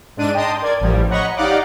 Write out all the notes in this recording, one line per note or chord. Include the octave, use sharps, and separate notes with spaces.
G#2 D4 D#7
D#5 G5 A5 A#5 C6 D#6
A#4 D5 G#6
A1 F3 G3
C#5 D#5 F#5 A#5 B5 C#6
D#4 G4 D5 F5 F#5 D6